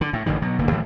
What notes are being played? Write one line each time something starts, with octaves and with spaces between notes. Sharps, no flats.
D3
A2
A1 G2 D3 D#3
B2 F#3
F1 D3 A#3
D2 A2 E3 G3